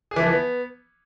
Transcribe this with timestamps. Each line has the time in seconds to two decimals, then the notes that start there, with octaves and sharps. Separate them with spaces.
0.11 G#4
0.16 E3
0.21 F3
0.26 E3
0.31 B3